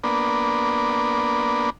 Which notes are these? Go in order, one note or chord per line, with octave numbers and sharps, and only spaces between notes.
A#3 B3 D4